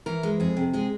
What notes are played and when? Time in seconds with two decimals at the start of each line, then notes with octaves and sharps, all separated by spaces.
0.06 E3 A#4
0.23 G#3
0.40 F2 G#4
0.57 C3
0.73 G#3 G#4